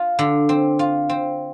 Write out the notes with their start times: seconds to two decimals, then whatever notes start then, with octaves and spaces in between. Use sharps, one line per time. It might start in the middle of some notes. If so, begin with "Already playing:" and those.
Already playing: F4
0.19 D3
0.49 C4
0.79 F4
1.09 C4